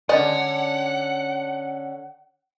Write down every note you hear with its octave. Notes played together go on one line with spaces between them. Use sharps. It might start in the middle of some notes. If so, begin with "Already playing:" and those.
D3 G#3 C#4 D5 D#5 F#5